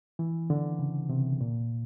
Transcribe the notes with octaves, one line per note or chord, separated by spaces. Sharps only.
E3
D3
C#3
C3
A#2